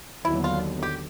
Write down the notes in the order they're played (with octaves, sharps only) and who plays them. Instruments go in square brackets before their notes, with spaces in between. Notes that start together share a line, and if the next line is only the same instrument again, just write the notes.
[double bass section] D#2 D3 F#3 B3 [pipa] E4
[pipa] F4
G4